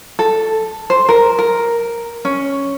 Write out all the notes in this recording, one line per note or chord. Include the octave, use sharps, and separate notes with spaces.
A4
C5
A#4
A#4
C#4